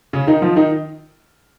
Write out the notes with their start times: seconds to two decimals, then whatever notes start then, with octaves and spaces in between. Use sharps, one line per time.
0.13 C#3 C#4
0.27 D#3 D#4
0.42 F3 F4
0.56 D#3 D#4